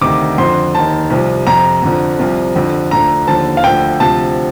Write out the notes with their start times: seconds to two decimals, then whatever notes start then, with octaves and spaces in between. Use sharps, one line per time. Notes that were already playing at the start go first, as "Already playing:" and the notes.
0.01 D2 C3 D#3 D6
0.38 F2 D3 F3 C6
0.74 D#2 D#3 A5
1.10 C2 C3 F3
1.47 F2 C3 F3 A#5
1.83 F2 D3 F3
2.19 C2 C3 F3
2.56 F2 D3 F3
2.91 D2 D3 F3 A#5
3.28 D#2 D3 F3 A5
3.57 F5
3.64 D2 D3 F3 G5
4.00 D2 C3 F3 A5